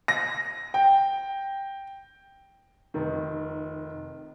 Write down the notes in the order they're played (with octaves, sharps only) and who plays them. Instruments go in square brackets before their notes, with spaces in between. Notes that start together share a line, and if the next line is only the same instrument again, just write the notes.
[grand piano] A#6
G5
[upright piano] F1 D#3